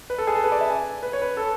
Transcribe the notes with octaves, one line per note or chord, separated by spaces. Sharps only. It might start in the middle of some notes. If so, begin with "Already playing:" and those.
B4
A4
G#4
A4
B4
D5
E5
G#5
B4
C#5
B4
A4